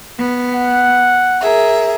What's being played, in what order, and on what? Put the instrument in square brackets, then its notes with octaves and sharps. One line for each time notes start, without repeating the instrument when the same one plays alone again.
[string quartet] B3
[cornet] F#5
[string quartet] G#4 A#4 E5